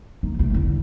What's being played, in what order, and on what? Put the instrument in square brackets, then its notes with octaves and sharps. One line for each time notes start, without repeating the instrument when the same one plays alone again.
[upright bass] D#2 D#4
C2 A3
E2 D3